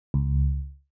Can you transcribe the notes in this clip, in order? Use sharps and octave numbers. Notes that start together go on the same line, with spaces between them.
C#2